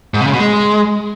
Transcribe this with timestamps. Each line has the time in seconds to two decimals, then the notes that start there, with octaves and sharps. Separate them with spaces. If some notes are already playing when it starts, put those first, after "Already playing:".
0.14 G#2
0.20 C3
0.27 C#3
0.33 B2
0.40 G#3